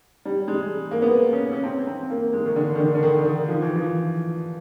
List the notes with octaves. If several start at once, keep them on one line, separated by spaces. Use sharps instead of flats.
G3
G#3
A#3
B3
C#4
C#4
C4
C4
A#3
G#3
D#3
D3
D#3
D3
D3
D#3
D#3
F3
E3
F3